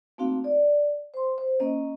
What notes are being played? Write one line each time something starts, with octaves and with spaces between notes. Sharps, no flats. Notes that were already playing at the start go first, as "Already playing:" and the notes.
A3 A#3 C4 D#4 F#4 F5
D5
C5 C6
C5
A#3 C#4 D#5